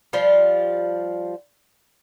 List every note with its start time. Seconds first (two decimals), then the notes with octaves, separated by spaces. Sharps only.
0.13 F3 G3 F4